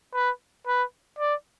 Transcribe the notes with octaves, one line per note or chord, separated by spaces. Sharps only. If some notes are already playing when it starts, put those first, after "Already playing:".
B4
B4
D5